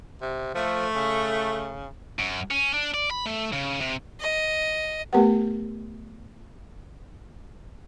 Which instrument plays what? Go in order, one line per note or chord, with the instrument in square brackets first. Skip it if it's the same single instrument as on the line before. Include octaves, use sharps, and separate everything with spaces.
[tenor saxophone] C3
[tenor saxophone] F3 [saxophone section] A3
[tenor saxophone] C#3
[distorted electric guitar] F#2
C#4
D4
D5
B5
A3
C#3
C3
[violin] D#5
[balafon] A3 B3 G4 A#4 B4 F#5